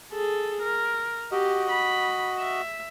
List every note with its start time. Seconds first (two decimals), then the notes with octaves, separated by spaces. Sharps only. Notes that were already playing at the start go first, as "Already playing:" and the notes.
0.12 G#4 A4
0.62 A#4
1.31 F#4 G4 D#5
1.70 B5
2.39 E5